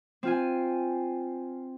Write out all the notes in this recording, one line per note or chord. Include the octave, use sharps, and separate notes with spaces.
C4 F4 G#5